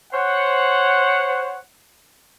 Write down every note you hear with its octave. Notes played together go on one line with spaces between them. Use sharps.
C5 C#5 F#5